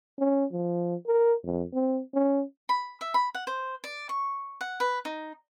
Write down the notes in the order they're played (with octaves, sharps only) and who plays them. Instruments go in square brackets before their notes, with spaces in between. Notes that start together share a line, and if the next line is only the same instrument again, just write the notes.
[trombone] C#4
F3
A#4
F2
C4
C#4
[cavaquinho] B5
E5
B5
F#5
C5
D5
C#6
F#5
B4
D#4